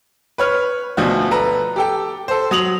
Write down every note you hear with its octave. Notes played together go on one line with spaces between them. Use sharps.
B4 C#5 F6
D2 B2 F3 D4 F#4
A4 B4 A#5
G4 A4 G5
A4 C5
F#3 D#6 F7 F#7